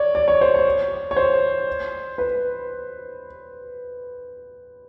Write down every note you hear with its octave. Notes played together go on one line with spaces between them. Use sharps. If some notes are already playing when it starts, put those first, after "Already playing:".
Already playing: C#5 D5
D5
C#5
C5
C#5
C#5
C5
B4